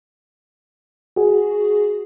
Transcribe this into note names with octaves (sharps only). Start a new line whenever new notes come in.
F#4 G#4